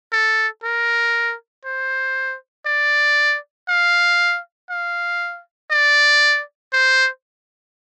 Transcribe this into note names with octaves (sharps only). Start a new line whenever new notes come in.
A4
A#4
C5
D5
F5
F5
D5
C5